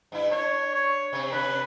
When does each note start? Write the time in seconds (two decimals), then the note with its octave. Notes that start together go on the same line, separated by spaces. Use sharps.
0.12 G2 E4
0.31 D4 C#5
0.74 C#5
1.13 C3 C4
1.32 C3 D4 B4